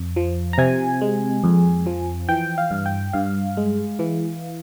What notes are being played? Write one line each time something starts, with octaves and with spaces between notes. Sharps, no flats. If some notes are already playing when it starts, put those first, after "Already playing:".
Already playing: F2
F3
A#5
C3 G#5
G#3
F2
F3
E3 G5
F5
G2
G5
G2 F5
G#3
E3